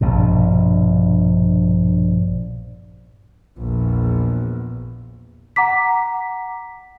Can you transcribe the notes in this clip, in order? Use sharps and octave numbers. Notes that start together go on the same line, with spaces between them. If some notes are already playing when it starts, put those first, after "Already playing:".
A#1 G2 B2
A#1 E2
F#5 A#5 D6 B6